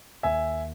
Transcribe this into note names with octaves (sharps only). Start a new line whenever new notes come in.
D#2 E5 G#5